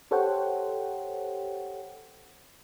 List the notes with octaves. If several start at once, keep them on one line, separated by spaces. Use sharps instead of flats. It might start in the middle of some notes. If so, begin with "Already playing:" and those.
G4 A4 C5 C#5 F#5 G5